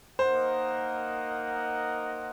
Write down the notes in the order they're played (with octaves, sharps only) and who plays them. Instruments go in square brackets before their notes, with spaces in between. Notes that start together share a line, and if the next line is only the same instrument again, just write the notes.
[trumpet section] A#3 D#4 A#4 D#5 F#5 [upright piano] C5